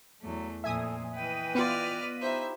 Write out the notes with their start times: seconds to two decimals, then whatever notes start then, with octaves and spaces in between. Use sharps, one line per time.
0.21 E2 F#3 A3
0.64 F2 A#2 A4 E5 G#5 D#6
1.16 E3 B4 D#5 G5
1.55 B3 F4 D5 F6
2.21 D#4 E4 G4 C5 E5